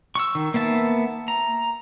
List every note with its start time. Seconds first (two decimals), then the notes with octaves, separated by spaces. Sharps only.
0.15 C#6 E6
0.35 D#3
0.54 A#3 B3 E5 A5
1.28 A#5